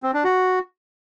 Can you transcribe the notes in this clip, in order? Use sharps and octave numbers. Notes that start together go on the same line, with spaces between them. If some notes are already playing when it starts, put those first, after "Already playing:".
C4
D4
F#4